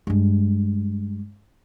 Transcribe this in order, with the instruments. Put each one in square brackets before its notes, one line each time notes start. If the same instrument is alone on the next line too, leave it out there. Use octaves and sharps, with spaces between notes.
[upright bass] G2 G#3